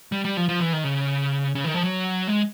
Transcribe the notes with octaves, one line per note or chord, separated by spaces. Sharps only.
G3
G3
F3
F3
E3
D#3
C#3
C#3
D#3
F3
F#3
G#3